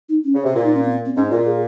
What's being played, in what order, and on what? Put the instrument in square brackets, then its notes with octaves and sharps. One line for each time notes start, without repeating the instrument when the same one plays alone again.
[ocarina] D#4
C#4
[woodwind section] C#3
C3
[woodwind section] A#2 [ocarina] F4
[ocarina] D#4
C#4
C4
C4
[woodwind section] G#2 [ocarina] C#4
[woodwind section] A#2 [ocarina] F4
[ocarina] G#4